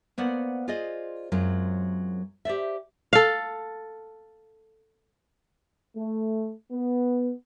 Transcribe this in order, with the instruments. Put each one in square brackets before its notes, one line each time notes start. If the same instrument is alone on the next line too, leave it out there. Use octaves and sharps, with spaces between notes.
[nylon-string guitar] A#3 B3 C5 D5 F#5
F4 G#4 C5 D5 D#5
F#2 F#3 G#3 C4 F4
G4 C5 D5 E5
[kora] A4 F5
[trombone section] A3
B3